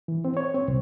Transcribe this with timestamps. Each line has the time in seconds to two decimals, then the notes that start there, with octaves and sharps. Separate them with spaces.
0.08 E3
0.25 C4
0.37 C#5
0.54 C4
0.68 C2